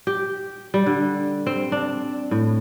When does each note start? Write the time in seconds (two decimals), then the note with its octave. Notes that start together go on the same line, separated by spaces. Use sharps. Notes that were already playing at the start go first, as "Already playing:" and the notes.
0.07 G4
0.74 G3
0.86 D3
1.47 C4
1.72 D4
2.31 A2